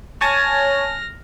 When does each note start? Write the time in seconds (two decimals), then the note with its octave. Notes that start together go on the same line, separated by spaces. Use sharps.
0.21 C#5 G#5 A5 F6 A#6